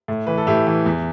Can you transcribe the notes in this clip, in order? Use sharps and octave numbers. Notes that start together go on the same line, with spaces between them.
A2
E3 B4
A4
A2 E4 G4
E3
E2